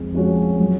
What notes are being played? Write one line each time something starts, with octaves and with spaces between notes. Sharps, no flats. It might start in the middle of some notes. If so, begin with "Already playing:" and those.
Already playing: F2 G#3
F3 G#3 C#4 F#4
F#3